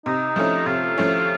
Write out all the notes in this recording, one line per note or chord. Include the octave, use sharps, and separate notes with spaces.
C3 D#4
F3 A3 C#4 E4
C3 F4
F3 A3 C#4 E4